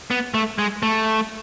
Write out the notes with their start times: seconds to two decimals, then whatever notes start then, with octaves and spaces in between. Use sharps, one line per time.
0.11 B3
0.34 A3
0.59 G#3
0.83 A3